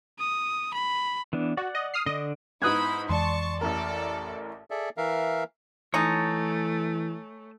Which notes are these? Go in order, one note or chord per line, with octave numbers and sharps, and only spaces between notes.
D#6
B5
E3 B3 D4
F#4 D5 F#5
D#5
D#6 F6 C7
D3 D4 D#5
G#2 B3 D#4 E4 B5 D#6 F#6 G#6
F2 E3 G#3 D5 A5 C6 C#6
A1 A2 A4 A#4 D5
G#4 A4 D5 E5
E3 A#4 E5 F5
E3 G#3 A3 D#4 C#5 G#5 A5